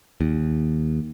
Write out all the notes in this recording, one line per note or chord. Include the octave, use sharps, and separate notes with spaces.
D#2